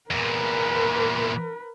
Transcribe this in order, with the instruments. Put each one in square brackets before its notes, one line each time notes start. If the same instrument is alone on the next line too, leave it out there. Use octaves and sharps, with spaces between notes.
[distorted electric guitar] E2 A#2 [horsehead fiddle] A#4 B4